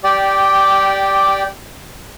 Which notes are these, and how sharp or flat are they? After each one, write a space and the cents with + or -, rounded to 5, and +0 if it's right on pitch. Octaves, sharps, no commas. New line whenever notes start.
G4 +0 D5 +0 G5 -15